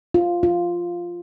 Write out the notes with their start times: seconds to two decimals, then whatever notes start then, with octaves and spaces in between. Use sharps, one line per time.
0.14 F4
0.43 F4